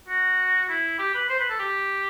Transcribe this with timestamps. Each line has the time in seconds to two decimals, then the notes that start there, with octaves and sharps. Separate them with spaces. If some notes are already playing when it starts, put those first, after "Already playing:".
0.08 F#4
0.69 E4
0.99 G4
1.14 B4
1.29 C5
1.40 B4
1.50 A4
1.59 G4